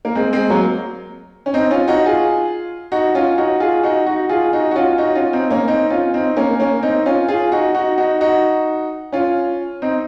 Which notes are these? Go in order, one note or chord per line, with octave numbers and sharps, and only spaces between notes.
A#3
G#3 C4
G#3 C4
F#3 A#3
C#4
C4 D#4
C#4 F4
D#4 F#4
F4 G#4
D#4 F#4
C#4 F4
D#4 F#4
F4 G#4
D#4 F#4
D#4 F#4
F4 G#4
D#4 F#4
F#4
C#4 F4
D#4 F#4
C#4 F4
C4 D#4
A#3 C#4
C4 D#4
C#4 F4
C4 D#4
A#3 C#4
A#3 C#4
C4 D#4
C#4 F4
F4 G#4
D#4 F#4
D#4 F#4
D#4 F#4
D#4 F#4
C#4 F4
C4 D#4